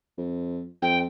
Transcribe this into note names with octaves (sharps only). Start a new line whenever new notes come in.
F2
F2 G5